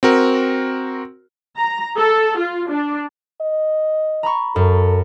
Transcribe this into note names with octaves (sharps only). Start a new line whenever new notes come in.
C4 F#4 A#4
A#5
A4
F4
D4
D#5
A#5 B5 C#6
F#2 A4